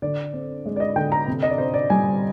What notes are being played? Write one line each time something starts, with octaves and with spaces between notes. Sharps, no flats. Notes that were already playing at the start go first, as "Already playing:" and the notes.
D3 D5
C4
G#3
D5
D#5
D3 G5
A#5
C3
D#5
D5
C4 C5
D5
G3 G#5